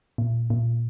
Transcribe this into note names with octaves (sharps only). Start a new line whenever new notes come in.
A#2
A#2